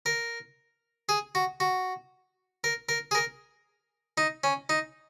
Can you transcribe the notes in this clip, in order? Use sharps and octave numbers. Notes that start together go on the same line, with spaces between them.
A#4
G#4
F#4
F#4
A#4
A#4
G#4
A#4
D#4
C#4
D#4